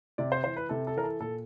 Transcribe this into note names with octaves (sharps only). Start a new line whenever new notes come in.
C3 D5
C5
E3 C5
B4
C3 A4
A4
E3 A#4
A4
A#2 A4